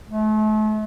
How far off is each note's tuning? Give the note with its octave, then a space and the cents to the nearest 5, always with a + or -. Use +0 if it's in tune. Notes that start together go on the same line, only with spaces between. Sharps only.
A3 -40